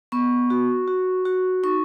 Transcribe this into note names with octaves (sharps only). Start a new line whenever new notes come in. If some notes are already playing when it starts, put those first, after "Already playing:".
B3 C#6
F#4
F#4
F#4
D#4 C#6